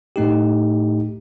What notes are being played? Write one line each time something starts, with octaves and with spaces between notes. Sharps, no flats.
A2 A3 D#4 G4